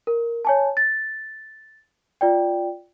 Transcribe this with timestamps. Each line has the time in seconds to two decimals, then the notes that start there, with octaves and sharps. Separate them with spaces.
0.07 A#4
0.45 C#5 G#5 A5
0.77 A6
2.21 F4 D5 G5